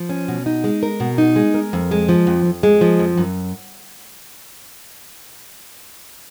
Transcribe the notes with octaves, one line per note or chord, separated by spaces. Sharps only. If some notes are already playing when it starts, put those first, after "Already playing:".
Already playing: F3
C#4
B2
D#4
G#3
A#4
B2
D#4
G#3
A#4
F2
G#3
F3
F2
F2
G#3
F3
F2
F#2